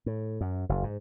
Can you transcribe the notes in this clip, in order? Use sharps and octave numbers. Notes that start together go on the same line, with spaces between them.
A2
F#2
F#1
G#2